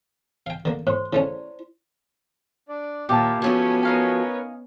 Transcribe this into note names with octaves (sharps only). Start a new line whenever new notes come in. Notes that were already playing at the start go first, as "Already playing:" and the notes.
F5 G5
D3 A#3
A2 C5 C6
C#3 A3 C#4 E4 D5
D4 D5
D#2 A#2 E4 G4 F5 A5
F3 F#3 A3 B3 C#4 C#5 G#5 B5
D#4 A#4 B4 C#5 F5 G#5